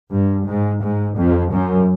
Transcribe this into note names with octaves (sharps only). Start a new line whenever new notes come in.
G2
G#2
G#2
F2
F#2